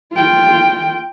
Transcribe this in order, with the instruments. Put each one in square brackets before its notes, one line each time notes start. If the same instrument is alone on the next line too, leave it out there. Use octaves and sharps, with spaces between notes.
[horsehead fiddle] F4 G5